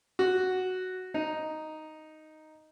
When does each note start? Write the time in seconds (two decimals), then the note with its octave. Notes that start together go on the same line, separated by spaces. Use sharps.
0.19 F#4
1.14 D#4